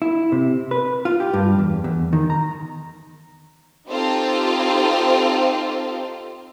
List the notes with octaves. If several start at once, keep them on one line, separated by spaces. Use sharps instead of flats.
E4
C3
B4
F4
G4
G2
E2
E2
D#3
A#5
C4 D#4 F4 G4 A4 C5